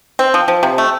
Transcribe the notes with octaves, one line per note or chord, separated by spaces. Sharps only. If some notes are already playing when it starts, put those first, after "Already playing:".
C4
F3
F3
C3
A3